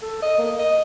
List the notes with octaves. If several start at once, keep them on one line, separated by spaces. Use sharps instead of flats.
A4
D#5
A#3
D#5